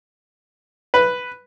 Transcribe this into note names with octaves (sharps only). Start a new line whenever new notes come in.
B4